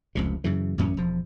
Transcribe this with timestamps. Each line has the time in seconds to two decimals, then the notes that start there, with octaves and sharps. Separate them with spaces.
0.15 F1 C#2 C3
0.44 F#2 C#3 E3
0.78 A1 F#2 C#4
0.97 E1 F3